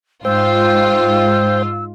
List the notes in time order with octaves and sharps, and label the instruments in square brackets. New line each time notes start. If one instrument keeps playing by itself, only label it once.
[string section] G#2 F4 [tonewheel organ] C5 G5 [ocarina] E6